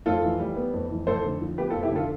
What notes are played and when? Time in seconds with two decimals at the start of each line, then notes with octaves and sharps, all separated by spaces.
0.06 F2 F4 A4
0.23 E3
0.40 G3
0.56 B3
0.73 F2
0.90 E3
1.07 F2 A4 C5
1.24 D3
1.41 F3
1.58 B3 G4 B4
1.70 F4 A4
1.75 F2
1.83 E4 G4
1.91 D3 F4 A4